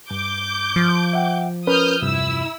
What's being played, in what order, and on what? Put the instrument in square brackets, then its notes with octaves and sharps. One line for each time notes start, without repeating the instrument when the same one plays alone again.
[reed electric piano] G2 [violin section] D6 G6
[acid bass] F3
[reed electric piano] E5 F#5 G5
[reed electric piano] C#4 A#4 B4 [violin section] D#6 F6 G6
[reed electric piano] E2 G2 C3 [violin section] E4 E6